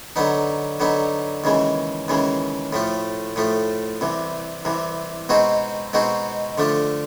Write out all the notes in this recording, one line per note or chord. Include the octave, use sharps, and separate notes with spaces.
D3 F#3 B3 D#4
D3 F#3 B3 D#4
D#2 C#3 E3 G#3
D#2 C#3 E3 G#3
A2 F3 A3
A2 F3 A3
C2 C3 E3
C2 C3 E3
B2 G#3 C4 D#4 F#4
B2 G#3 C4 D#4 F#4
D3 F3 A3 D4